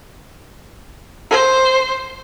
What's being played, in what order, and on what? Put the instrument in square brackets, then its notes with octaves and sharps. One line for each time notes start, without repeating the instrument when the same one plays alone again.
[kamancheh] C5